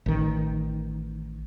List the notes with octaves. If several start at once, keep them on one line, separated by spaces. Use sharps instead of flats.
A1 D#3